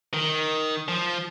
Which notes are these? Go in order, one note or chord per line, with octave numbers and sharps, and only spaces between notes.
D#3
F3